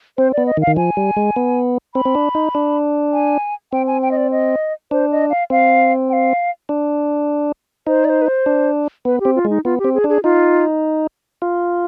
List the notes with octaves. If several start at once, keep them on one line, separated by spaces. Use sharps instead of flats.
C4 C5
B3 D5
D#5
D#3
F5
D#3
F3 G#5
G3
G#3
B3
C4 B5
C4
D4
D#4
D4
G#5
C4 G5
G#5
G5
D#5
D5
D#5
D4 C5
D#5
F5
C4 F5
G5
F5
D4
D#4 C5
D5
C5
B4
C5
D4
B3 B4
G4
C4
F4
G#3
D#4
B3 F4
G4
C4
G#4
D4
G#4
D#4 F4
F4